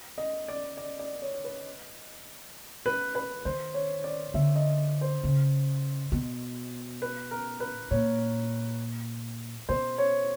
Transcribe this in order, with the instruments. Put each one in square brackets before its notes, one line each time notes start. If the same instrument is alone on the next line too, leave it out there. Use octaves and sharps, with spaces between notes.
[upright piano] D#5
D5
D5
D5
C#5
B4
B4
B4
[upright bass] D#3 [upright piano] C5
[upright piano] C#5
D5
[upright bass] D3 [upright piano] E5
[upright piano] D#5
C5
[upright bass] C#3
B2
[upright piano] B4
A#4
B4
[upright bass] A#2 [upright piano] C#5
[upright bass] B2 [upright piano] C5
[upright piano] C#5